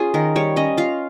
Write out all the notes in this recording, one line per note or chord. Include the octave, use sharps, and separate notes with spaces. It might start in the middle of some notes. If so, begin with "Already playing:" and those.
Already playing: C#4 F4 G#4
D#3 A#4
G3 C#5
C#4 D#5
F4 F5